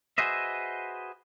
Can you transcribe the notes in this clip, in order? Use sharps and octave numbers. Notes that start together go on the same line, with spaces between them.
F#4 G#4 B4 C5 D#5 E5